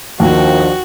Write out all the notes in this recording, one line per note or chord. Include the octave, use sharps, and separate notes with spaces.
D#2 D#3 F3 D4 F#4